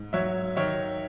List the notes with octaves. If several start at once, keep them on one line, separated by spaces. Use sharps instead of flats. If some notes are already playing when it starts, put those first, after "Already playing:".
Already playing: G#2
F#3 C#5 E5
D#3 C#5 E5